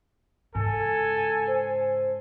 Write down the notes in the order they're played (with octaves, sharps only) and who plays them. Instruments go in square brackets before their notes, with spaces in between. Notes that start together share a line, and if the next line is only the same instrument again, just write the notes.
[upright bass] G#2 C#3 [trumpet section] A4 G#5
[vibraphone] C5